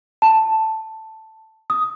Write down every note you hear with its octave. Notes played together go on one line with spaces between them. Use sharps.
A5
D#6